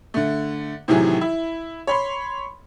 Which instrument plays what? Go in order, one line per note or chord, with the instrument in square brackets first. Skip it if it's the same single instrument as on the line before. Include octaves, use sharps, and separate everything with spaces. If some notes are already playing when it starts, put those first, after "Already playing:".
[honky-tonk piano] D3 A3
A2 C3 D#3 E3 F#3 G#4
E4
C#5 B5 C6